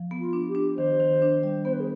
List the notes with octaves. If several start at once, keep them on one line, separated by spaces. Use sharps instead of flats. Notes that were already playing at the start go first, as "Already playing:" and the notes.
Already playing: F3
B3
F4
D4
G4
D4
D#3 C5
D#3
D4
G3
B3 C5
B4
G#4